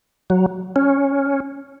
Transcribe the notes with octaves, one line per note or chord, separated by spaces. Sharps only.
F#3
C#4